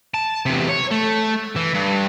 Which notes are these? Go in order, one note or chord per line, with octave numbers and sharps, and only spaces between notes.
A5
E2 C3
C#5
A3
E3
G2